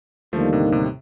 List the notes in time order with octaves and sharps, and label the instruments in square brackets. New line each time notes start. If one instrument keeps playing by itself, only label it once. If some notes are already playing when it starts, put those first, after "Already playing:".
[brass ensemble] D#2 D3 G3 A#3 D#4 [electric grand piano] F3 A3
[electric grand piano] A2 C3
A2 C3